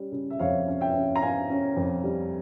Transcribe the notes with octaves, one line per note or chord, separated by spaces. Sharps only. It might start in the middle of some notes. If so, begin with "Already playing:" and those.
Already playing: G3 C#4
C#3
E5
F2 C#5 F5
C#4
E5 G5
C#4
A#5
C#4 F5 G#5
C#4
F2
G3